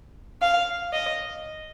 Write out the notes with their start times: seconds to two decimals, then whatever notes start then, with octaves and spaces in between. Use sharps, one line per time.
0.42 F5
0.93 D#5